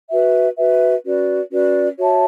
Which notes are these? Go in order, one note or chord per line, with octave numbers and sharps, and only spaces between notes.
F#4 B4 E5
F#4 B4 E5
C#4 F#4 B4 D5
C#4 F#4 B4 D5
F#4 C#5 E5 A5